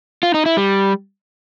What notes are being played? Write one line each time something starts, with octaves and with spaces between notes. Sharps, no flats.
F4
D#4
E4
G3